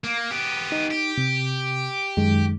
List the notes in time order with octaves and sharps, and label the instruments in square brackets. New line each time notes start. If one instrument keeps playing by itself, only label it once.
[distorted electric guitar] A#3
B3 G4
[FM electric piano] D#4
[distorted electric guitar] G4
[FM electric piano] C3
F#2 D#3 G#3